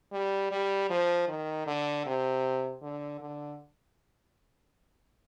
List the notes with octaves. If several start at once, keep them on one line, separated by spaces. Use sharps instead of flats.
G3
G3
F3
D#3
D3
C3
D3
D3